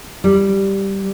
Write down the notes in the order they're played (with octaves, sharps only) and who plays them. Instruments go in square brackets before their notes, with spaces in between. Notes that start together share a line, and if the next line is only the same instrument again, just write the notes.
[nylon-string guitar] G3